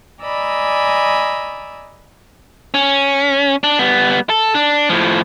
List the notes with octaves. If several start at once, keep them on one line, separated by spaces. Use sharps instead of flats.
D5 D#5 G#5 A#5 B5 E6
C#4
D4
G3 B3
A4
D4
A2 F3